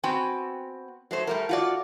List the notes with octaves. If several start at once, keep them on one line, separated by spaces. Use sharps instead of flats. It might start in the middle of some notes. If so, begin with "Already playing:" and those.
B3 C4 F#4 G5 G#5
F#3 A3 C5
G3 A3 A#4
F4 F#4 D5